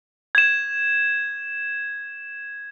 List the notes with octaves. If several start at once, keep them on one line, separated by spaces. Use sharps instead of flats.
G#6 E7